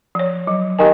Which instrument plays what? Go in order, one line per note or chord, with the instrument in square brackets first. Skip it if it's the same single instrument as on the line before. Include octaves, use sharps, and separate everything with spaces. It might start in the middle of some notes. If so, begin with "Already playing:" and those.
[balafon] F3 C#5
F#3
[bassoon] D#3 [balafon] G4 G5 G#5